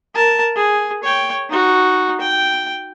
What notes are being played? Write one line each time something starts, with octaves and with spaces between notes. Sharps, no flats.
A#4 A5
G#4
C#5 G5
D#4 F#4
G5